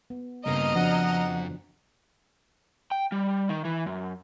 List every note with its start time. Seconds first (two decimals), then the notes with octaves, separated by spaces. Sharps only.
0.10 B3
0.47 G2 C#3 A#3 B3 D#5 A#5 F6
0.75 F2 F3 D4 F#4 F#5
2.92 G5
3.12 G3
3.49 D#3
3.65 E3
3.86 F#2